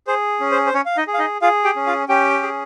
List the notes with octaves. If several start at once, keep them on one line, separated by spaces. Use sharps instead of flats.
G#4 C5
C#4
C5
C5
C#4 C#5
F5
D#4 D#5
G#4
F5
D#4 D#5
F4 G#4 F5
G4 G5
C#4
F4 F5
C#4 G4 G5
G#4